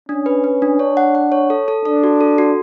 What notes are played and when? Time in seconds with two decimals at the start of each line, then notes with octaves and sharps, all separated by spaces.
0.09 C#4 D4
0.26 B4
0.44 B4
0.62 D4
0.79 D4 C#5
0.97 F#5
1.15 F#5
1.32 C#5
1.50 A4
1.68 A4
1.85 D4 A4
2.04 F#4
2.21 A4
2.38 F#4